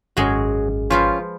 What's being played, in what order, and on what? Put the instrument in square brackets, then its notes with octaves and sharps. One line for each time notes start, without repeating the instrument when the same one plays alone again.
[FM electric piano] G#1 [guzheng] F#2 G#3 [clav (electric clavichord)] F#4 G#4 C#5
[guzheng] F3 B4 C5 [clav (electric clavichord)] C#4 [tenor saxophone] F4